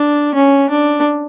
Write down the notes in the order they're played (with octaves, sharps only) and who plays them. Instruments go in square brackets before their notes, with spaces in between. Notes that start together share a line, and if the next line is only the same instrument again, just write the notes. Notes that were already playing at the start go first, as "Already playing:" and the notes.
Already playing: [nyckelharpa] D4
C#4
D4